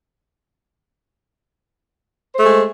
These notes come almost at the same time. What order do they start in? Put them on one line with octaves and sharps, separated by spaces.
C5 A3 G#3